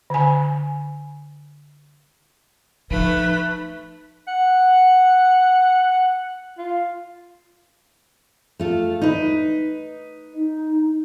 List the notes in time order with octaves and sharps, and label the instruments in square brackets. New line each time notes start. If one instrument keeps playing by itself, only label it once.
[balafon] D3 G#5
[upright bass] F3 [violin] A3 B5 [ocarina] D#4 [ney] B4
[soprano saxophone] F#5
F4
[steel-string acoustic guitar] A3 F4 A4
D#4 B4
[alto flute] D#4